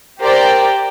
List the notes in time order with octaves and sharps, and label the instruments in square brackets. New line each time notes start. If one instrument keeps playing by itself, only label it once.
[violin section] G4 A#4 C5 D5 G5